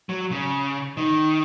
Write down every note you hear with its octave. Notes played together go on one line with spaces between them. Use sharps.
F#3
C#3
D#3